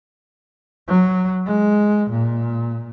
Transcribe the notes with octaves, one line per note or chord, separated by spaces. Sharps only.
F#3
G#3
A#2